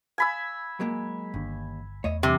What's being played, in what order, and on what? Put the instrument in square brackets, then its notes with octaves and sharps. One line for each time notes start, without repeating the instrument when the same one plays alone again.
[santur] G#5 B5 E6
[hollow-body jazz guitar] F#3 G#3 A#3
[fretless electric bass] G1 D3 D4 [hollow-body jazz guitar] D#2
[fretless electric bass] E2 A3 [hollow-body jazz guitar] C#5 D#5 E5
[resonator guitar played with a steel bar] C3 [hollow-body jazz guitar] E3 F3 G3